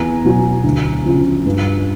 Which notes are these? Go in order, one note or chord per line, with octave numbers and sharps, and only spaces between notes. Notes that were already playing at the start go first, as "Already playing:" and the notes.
Already playing: E2 G#5 A#5
B2 F#3
D2
C#3 F3
G2